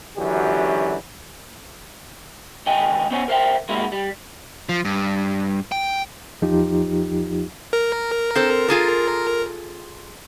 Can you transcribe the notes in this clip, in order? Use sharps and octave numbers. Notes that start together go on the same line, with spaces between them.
C#2 F#2 D3 E3 F#4 G4
C#2 D#3 D#5 G5 G#5
B3 C#4 C5 C#5 G#5
A#4 C5 D#5 E5 G5
G#3 A#3 D#4 E4 F#4
G3
F3
G2
G5
E2 F3 D#4 F4 G4
A#4
C4 A4 C5
F4 G#4 A4